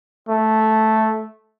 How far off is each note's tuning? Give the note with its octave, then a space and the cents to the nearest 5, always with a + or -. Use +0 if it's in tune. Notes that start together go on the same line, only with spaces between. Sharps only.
A3 -5